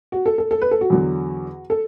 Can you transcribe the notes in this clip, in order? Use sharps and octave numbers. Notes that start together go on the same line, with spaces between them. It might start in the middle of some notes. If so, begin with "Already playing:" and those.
F#4
A4
A4
A4
B4
A4
F#4
E2 D3 F#3
A4